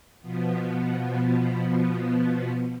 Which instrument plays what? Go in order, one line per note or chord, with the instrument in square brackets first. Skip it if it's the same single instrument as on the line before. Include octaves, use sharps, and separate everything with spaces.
[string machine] B2 F3 B3